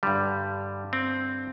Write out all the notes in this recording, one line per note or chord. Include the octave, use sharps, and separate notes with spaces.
G2 D3 G3
C4